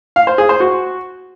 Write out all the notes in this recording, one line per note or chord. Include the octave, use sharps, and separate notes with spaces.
F5
C5
G#4
C5
F#4